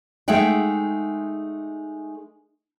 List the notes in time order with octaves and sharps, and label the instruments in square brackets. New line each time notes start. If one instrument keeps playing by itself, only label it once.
[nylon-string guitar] G#3 A3 D#4 E5 F#5 G5